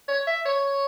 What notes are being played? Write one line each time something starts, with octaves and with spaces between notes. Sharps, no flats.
C#5
E5
C#5